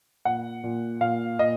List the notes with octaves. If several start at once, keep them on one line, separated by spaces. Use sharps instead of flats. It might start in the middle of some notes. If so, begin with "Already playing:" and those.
A#2 F#5
A#2
A#2 F5
A#2 D#5